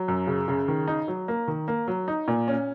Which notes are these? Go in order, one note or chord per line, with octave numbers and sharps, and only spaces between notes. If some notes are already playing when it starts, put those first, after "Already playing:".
Already playing: F#3
F#2
C#3
C#3
D#3
D#4
F#3
A#3
D#3
A#3
F#3
D#4
A#2
C#4